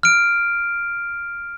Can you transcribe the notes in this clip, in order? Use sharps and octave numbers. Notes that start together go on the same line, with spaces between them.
F6 D7